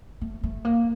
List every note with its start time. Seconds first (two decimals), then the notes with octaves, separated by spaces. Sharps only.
0.21 A3
0.44 A3
0.65 A#3